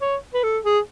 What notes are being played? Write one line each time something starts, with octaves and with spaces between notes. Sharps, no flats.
C#5
B4
A4
G#4